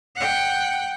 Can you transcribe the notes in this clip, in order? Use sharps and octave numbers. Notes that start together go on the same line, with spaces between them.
F#5 G5